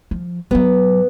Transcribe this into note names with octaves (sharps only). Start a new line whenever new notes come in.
F3
G#2 F#3 B3